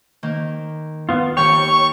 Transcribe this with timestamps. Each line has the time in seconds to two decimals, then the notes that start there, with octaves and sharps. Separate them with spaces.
0.23 D#3 A#3
1.09 B3 F4
1.37 D#2 C#5 G5 C#6